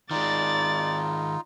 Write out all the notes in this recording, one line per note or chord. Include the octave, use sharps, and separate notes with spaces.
D#3 G#3 D#4 F4 D5 A6